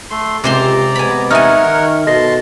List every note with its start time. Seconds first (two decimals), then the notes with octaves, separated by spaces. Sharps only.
0.11 A3 C6
0.44 C#2 C3 G4 C5 D5 A#5 C6
0.96 C3 G#3 B3 G#5 B5
1.31 D#4 A#4 C#5 E5 F#5 G#5 F6
1.62 D#3
2.07 B2 A4 D#5 A5 C6 A#6